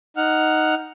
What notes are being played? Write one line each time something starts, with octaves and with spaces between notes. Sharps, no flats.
D#4 F#5 F6